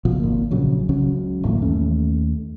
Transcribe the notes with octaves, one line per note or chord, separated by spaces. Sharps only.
C#2 B2 F3
G#1 A#3
A#1 C#3 F#3
C#2 C#3 F#3 C#4
G1 A2 E3 A#3
D#2 A3 C#4